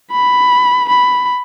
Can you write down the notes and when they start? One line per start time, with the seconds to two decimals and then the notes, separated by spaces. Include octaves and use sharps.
0.11 B5
0.89 B5